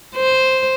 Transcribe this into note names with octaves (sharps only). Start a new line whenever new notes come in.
C5